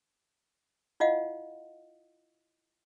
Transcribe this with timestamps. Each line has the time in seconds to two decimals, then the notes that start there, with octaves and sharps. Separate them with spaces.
1.00 E4 F4 D#5 F5 F#5